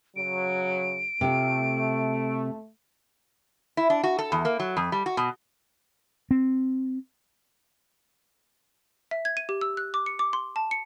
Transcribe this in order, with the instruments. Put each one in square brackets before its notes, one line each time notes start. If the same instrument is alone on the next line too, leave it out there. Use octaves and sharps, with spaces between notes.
[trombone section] C#3 F#3 [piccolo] D7
[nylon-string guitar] C3 F4 [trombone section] A3
[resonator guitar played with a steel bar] E4
D4
F#4
A4
E2
A#3
F#3
F2
G3
F#4
B2
[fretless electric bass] C4
[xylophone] E5
G#6
D#7
G4
E6
F#6
D6
C#7
D6
C6
A5
C#7